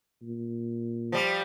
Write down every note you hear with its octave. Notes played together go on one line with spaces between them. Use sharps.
A#2
F3 G3